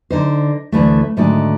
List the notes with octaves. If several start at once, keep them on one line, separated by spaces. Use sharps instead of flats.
D3 D#4 C5
D2 E3 A3
G#2 D3 D#3 A3 F#4 D#5